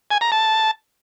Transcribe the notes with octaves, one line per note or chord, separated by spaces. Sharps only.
G#5
A#5
A5